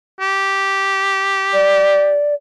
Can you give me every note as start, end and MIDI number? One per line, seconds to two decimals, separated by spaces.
0.20 2.19 67
1.53 2.34 74